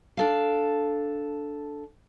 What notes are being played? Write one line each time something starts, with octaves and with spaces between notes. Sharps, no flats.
D4 A4 F5